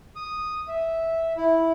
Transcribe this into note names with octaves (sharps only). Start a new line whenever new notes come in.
D#6
E5
E4